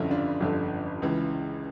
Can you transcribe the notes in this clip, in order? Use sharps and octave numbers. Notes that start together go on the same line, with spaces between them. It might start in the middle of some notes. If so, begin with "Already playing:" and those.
Already playing: G1 F2 D3 C#4 E4
D4 F4
G1 F2 D3
C#2 C#3 E3